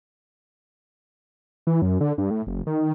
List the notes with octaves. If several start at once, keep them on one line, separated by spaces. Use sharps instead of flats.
E3
F#2
D3
G2
A2
F#1
D#3